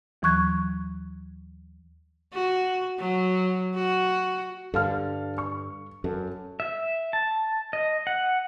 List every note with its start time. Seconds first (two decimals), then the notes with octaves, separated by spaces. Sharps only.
0.22 D#2 E3 F#3 C#6 F#6 G#6
2.34 F#4
2.99 F#3
3.75 F#4
4.74 G2 D3 A4 F5 F6
5.38 C#6
6.04 F#2 A4
6.60 E5
7.13 A5
7.73 D#5
8.07 F#5